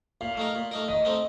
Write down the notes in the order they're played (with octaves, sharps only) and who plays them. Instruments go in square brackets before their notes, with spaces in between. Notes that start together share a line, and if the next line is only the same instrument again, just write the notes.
[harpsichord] A#2 [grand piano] F5
[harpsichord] A3 D#4 A#4
A#2
A3 D#4 A#4
[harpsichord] D#3 [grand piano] D#5
[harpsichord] A3 C4 D#4